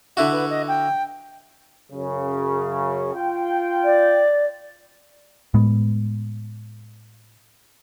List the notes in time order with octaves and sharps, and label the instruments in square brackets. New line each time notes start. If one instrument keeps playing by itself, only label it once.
[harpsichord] D3 E4 F#4 [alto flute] E5
[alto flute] B4
D#5
G5
[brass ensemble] F#2 C#3
F4 G5
[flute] D5
[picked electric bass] A2 G#3 B3